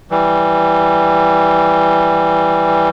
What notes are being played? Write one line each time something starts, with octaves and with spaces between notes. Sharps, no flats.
E3 G3